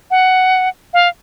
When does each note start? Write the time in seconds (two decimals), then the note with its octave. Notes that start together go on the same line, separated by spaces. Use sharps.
0.11 F#5
0.94 F5